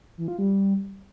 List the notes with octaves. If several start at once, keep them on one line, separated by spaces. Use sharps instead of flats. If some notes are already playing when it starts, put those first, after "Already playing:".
E3
F4
G3